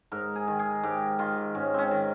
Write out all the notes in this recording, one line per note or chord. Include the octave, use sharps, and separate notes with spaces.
G#2 A#4
G#4
D#3
G#4
G#2 G4
D#3 F4
G#2 C#4
C4 C#4
D#3